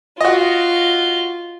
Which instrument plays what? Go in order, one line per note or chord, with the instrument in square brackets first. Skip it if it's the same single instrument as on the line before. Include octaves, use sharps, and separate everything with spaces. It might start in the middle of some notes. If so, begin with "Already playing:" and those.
[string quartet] F4 [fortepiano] F#4 D#5